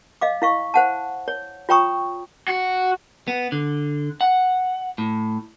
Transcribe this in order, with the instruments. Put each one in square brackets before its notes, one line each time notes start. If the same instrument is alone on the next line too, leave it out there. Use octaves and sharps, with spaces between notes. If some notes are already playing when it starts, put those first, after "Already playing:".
[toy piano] D#5 F5 D6
E4 F5 C#6
C5 F#5 A5
C#5
F4 C#5 G5 A#5 C#6 D#6
[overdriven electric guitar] F#4
[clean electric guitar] B3
D3
F#5
A2